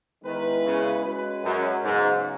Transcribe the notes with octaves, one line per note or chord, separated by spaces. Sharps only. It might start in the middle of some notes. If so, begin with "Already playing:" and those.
D#3 G#3 B3 E4 B4
C#3
G#3 C#4 F#4 B4
F#2
G#2 C#3 F#3 B3 F#4